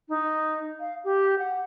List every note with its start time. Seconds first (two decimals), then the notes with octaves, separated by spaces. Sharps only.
0.09 D#4
0.80 F5
1.04 G4
1.39 F#5